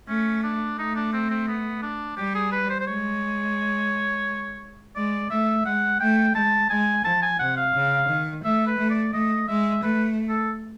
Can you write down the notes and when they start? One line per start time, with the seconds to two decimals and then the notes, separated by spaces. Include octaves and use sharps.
0.08 A3 C#4
0.43 D4
0.79 A3 D#4
0.96 D4
1.13 C4
1.30 C4
1.48 B3
1.82 D4
2.17 G3 G4
2.35 G#4
2.52 B4
2.70 C5
2.80 C5
2.87 G#3 C#5
4.96 G#3 D5
5.31 A3 E5
5.66 G#3 F#5
6.00 A3 G5
6.35 G#3 A5
6.70 G#3 G#5
7.05 F3 A5
7.22 G#5
7.39 C3 F#5
7.57 F5
7.74 C#3
8.09 D#3
8.44 A3 E5
8.67 B4
8.78 A3
8.90 D5
9.14 A3 D#5
9.48 G#3 E5
9.83 A3 B4
10.29 A4